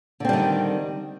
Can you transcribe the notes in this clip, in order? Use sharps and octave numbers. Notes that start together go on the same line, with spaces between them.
D3 D#3 G3 C4